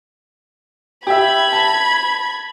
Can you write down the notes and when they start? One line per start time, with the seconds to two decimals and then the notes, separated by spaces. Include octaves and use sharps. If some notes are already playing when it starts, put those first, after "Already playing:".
1.07 G4 E5 B5 G#6
1.53 A5